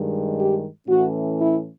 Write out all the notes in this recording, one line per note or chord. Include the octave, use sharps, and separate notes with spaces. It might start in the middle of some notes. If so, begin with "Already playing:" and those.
Already playing: G2 D#3 G#3
G4
A2 E3 A3 C#4 F#4
E4